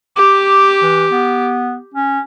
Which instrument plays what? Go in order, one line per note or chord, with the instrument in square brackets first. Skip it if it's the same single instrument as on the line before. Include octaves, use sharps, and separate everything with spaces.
[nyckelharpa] G4 [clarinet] D6
[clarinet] E3
B3
C#4